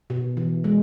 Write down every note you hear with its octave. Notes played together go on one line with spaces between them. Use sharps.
B2
E3
G#3